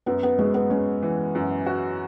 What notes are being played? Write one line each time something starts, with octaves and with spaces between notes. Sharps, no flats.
F#2 B3
B3
G#3 F#4
B3
G#3 C#4
E3
F#2
F#4